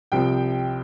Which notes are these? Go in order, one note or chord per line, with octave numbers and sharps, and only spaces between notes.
C2 C3 F3 G5